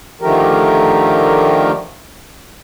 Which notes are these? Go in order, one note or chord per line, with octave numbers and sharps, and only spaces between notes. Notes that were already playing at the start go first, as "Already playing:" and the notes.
D3 D#3 F3 A3 G4 A#4